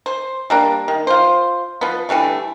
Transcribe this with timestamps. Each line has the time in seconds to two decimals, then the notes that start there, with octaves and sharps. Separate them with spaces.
0.06 C5
0.50 G3 A#3 D4
0.88 D#3
1.07 F4 C5
1.81 F3 B3
2.09 D3 E3 G3 A3